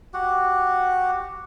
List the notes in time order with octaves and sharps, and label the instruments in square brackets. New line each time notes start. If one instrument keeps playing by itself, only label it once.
[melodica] F#4 G4 F#5